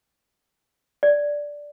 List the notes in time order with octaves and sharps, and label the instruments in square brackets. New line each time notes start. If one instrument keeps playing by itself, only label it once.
[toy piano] D5